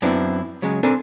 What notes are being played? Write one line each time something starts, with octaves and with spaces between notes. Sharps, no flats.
F#2 B3 C4 D4 E4
C#3 F#3 G#3 C#4
C4 D4 A4 A#4 G#5